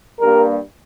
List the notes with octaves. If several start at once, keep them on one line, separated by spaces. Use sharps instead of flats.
G2 G3 A#3 A#4